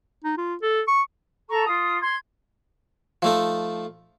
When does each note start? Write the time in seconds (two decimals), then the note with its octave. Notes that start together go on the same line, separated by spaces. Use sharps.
0.24 D#4
0.38 F4
0.62 A4
0.88 C#6
1.49 A4 A#5 C#6
1.65 F4 D#6
2.01 C6 G#6
3.22 F3 A3 D#4